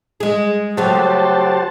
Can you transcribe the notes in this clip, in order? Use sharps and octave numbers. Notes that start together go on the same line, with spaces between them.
G#3 G#4
C#3 F#3 A3 F#4 G4 C5 A5